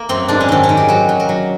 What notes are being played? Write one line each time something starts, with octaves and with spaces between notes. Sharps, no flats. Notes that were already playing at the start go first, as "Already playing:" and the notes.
Already playing: A#3
F#2 C4
G#2 D4
C#4
D#3 C4
C#4
D#3
G4
F#3 F#4
F#3
A#4
F#3